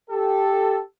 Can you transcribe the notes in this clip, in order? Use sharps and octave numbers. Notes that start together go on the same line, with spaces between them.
G4 A4